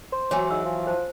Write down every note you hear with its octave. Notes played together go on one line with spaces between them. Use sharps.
C5
E3 F#3 C#5 G#5 A#5
G#2 E6
F3
C5 A5